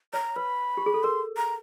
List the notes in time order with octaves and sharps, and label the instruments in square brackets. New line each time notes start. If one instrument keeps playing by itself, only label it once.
[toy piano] C#5 [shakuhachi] A#5
[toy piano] B4 [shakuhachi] B5
[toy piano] G4
G#4
A4
[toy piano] A#4 [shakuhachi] C6
[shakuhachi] A#5